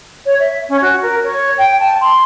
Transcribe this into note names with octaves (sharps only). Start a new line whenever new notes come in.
C#5
E5
C#4
F#4
A#4
C#5
G5
A5
C6